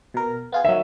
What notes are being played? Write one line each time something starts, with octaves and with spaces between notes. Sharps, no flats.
B2 A#4
B3 F4 G#4
D#3 F#3 E5